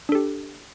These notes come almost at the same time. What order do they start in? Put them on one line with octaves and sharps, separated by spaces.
D4 A4 G4